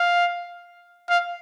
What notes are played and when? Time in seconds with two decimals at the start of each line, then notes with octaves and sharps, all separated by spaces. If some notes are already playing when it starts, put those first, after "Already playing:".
Already playing: F5
1.10 F5